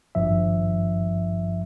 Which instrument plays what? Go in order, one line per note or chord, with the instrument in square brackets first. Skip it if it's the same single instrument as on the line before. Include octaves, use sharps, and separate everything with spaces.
[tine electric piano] G#1 G2 F3 E5